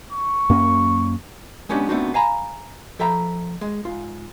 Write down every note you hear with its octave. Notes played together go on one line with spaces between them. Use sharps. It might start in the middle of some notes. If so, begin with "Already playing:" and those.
C#6
F#2 A#3 C#4
G#3 B3 C#4 D4 G4
A3 B3 C4 D4 D#4 F#4
F5 G#5 A#5 B5
F3 A4 E5 G5 A#5 B5
G#3
G#2 F4